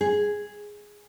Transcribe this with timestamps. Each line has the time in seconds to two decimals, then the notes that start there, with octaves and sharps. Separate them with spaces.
0.01 G#4